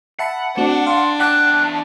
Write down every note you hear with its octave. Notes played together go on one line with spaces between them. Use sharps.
E5 F#5 A5 B5
A3 C4 D4 F#4
F5 C6
E2 F#5 G5 A5 D6 F#6